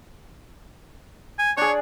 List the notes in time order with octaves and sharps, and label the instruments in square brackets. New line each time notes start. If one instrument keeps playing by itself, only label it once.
[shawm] G#5
[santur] D4 G#4 [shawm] C#5